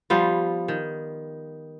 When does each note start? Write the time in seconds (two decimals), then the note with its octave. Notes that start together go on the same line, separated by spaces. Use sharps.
0.10 F3 G3 B3 F4
0.68 D#3